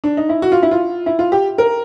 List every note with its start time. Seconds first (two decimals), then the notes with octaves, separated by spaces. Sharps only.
0.04 D4
0.17 D#4
0.29 E4
0.42 F#4
0.52 F4
0.63 E4
0.71 F4
1.06 E4
1.19 F4
1.32 G4
1.58 A#4